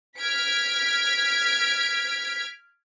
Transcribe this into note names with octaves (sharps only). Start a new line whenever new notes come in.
F6 G#6 B6 D7